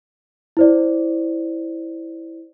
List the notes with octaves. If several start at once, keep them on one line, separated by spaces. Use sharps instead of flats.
E4 C5 D5